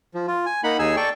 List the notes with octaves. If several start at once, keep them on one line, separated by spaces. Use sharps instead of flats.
F3
F4
G#5
A#3 D#4 F#5 B5
D#2 D#4 G#4 G#5 E6
A4 D5 G5 C#6